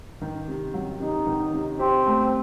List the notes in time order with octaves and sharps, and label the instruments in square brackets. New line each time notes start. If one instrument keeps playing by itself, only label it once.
[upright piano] D#3
C3
F#3
[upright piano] C3 [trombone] D#4
[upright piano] D#3
C3
[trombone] C4 [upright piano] G4
[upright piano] A3